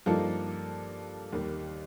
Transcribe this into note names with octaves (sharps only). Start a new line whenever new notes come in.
G2 F3 A#3 D#4 A4
D#2 D#3 G3